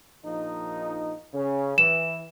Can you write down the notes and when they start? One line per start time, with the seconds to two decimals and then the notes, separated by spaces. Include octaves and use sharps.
0.24 A#1 F3 D#4
1.33 C#3 C#4
1.78 E3 E7